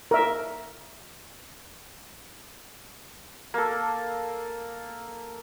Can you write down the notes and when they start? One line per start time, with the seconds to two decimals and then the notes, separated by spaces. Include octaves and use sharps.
0.11 A#4 E5
3.54 A#3 A4